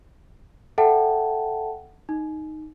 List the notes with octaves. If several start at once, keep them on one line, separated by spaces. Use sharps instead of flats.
A4 E5 F#5 G5 A5
D#4